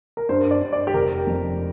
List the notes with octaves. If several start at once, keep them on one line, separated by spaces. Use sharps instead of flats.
A#4
G2 C5
D5
G2
D5
G4
F1 A#4
F2